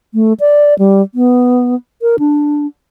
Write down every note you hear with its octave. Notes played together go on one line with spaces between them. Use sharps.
A3
D5
G3
B3
A#4
D4